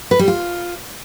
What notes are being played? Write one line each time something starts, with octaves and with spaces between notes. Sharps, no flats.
B4
G3
F4